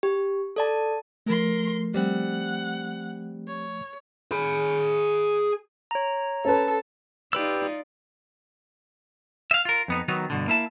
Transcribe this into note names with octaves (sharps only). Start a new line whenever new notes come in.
G4
A4 D5 A5
F3 A3 A#4 C6
G3 C4 F#5
C#5
G#4 B5
C#5 A#5
C#4 A4 B4 A5
D#4 F4 G4 B4 D5 E6
E5 F5
F4 A#4
F2 B3 D#4
D#3 F#3 B3 D#4
G2 B2 D3
A#3 E4 E5 A5